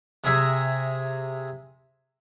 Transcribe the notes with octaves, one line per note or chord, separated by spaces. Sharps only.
C3 G#4 E5 A#5